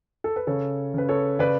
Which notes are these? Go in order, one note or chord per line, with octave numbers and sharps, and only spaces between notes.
A4
B4
C#3 A4 C#5
C#3 B4
A4 C#5
C#3 B4 D5